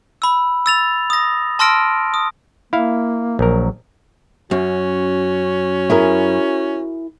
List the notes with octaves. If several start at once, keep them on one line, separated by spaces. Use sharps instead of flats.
B5 E6
E6 A6 F7
D#6 A#6
A5 C6 E6 F6 A#6 D7
D#6
A#3 E4 F5
A#1 F#3 A#4
F#2 C#4 F#4
E4 G#4 A#4